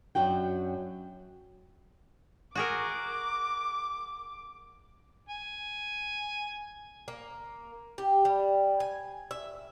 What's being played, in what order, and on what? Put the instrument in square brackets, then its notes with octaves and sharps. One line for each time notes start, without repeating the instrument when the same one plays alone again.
[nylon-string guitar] F#2 F#3 D4 F#4 G5
[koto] F#4 G#4 A#4 [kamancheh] D6
[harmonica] G#5
[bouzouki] A#3
G4
G3
G#5
E5